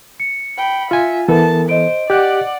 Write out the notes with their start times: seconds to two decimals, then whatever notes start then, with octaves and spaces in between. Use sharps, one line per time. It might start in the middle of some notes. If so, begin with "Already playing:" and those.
0.20 C#7
0.58 G5 B5
0.91 F4 E5 G#5
1.29 E3 B3 A4 A#4 A5
1.69 C5 D#5 D7
2.10 G4 D5 F#5 F#6